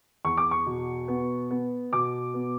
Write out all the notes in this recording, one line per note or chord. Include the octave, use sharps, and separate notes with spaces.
E2 C#6
D6
C#6
B2
B3
B3
B2 D6
B3